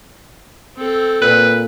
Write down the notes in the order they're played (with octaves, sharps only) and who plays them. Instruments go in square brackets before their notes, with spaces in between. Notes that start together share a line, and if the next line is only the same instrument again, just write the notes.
[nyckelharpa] C4 A4
[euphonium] A#2 [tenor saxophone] B4